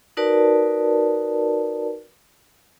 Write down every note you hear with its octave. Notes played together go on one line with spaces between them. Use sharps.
D#4 F#4 A#4 B4 D5 A5